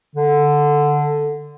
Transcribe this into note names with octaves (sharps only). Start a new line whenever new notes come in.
D3